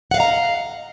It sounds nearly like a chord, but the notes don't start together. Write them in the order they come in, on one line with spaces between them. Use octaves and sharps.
F#5 F5 D#5 A#5